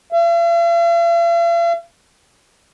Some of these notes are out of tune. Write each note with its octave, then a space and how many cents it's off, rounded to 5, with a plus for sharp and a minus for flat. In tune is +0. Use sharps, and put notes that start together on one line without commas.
F5 -45